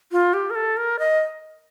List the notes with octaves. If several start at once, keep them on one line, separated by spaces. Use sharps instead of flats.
F4
G4
A#4
A4
A#4
D#5